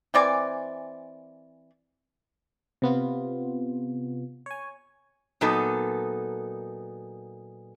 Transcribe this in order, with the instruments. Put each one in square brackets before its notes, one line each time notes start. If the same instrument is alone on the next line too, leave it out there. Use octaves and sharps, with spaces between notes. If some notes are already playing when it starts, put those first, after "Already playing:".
[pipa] E3 C4 D5 G#5
[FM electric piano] C3 B3 F4
C#5 G#5
[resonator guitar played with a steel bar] A#2 F#3 B3 D#4 A4